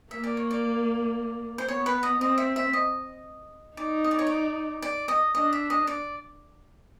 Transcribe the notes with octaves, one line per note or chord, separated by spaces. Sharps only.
A#3 E5
D5
C#5
D5
C5
B3 C#5
B4
D#5
C4 D#5
E5
E5
D#5
D#4 D5
D#5
D5
C#5
D5
D5
D#5
D4 D#5
E5
D#5
D5